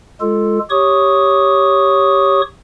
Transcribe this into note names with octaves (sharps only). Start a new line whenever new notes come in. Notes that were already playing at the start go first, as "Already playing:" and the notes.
G#3 F4 A4
G4 C#5 C#6 D#6